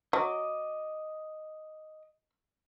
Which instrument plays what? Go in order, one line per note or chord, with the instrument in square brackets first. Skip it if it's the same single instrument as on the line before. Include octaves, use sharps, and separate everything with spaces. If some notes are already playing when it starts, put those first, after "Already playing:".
[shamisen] F#3 [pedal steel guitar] D#5 D6